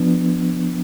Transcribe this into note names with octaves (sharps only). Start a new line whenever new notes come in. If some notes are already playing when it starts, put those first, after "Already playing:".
Already playing: F3 B3 D4